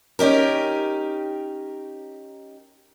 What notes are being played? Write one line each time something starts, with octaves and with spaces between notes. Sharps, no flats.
C#4 D#4 G4 A#4